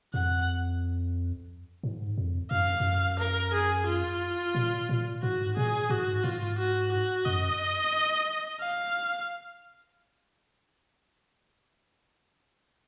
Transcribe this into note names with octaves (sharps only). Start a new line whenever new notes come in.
F2 F#5
G#2
F2
F#2 F5
F2
F#2
A#4
G#4
F4
A#2
A#2
G#2 F#4
A#2 G#4
G#2 F#4
G#2 F4
F#4
F#4
F#2 D#5
F5